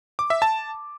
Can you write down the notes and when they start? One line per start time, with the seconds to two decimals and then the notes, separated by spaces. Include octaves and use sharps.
0.19 D6
0.30 E5
0.42 A5